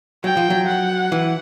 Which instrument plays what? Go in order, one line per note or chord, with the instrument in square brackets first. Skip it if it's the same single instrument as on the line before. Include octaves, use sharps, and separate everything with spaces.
[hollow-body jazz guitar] F#3 [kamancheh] G5
[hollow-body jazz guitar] F3
F#3
[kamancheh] F#5
[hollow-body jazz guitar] E3